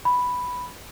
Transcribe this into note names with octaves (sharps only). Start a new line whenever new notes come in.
B5